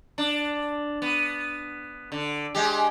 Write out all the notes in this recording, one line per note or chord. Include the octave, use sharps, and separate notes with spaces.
D4
B3
D3
G#3 G4